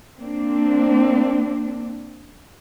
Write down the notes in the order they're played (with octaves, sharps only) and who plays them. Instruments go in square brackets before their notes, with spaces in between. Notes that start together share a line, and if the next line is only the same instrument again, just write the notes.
[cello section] A#3 C4 D4